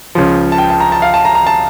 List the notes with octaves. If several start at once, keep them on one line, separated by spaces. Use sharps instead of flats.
C#2 C#3 F3
A5
G5
A5
A#5
A5
F5
A5
A#5
A#5
A5